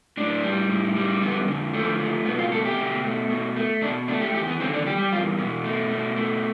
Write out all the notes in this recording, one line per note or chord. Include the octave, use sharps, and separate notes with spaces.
A2 D4
G3
A2
G3
F2 B3
D3
F3 A3
A3
B2 B3
F4
A3 A4
G4
B2
A3
B2
A3
B2 D4
A3 D4
G4
E2 G4
B3
D3 C4
D4
G3 G4
G4
E2 F4
B2
A3
B2
A3